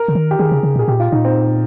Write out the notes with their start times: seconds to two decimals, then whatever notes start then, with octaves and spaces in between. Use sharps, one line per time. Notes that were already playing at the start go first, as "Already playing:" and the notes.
Already playing: A#4
0.08 C#3
0.15 D#3
0.31 G4
0.39 D#3 G#4
0.52 C#3
0.63 C#3
0.76 A#2
0.79 G#4
0.88 A#2 G4
1.00 F4
1.12 A#2 D#4
1.25 C4